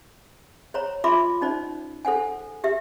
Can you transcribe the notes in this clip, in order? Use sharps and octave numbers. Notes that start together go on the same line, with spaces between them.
C5 C#5 A#5
F4 E5 B5 C6 D6
C#4 D#4 C5 D5
A4 C5 F#5 G#5
G4 E5